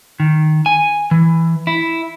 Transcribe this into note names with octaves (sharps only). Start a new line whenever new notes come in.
D#3
G#5
E3
E4